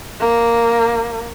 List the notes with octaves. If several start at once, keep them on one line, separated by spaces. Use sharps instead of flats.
A#3